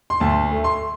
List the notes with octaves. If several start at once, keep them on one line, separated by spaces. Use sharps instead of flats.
C6
D2 A5
A3
C6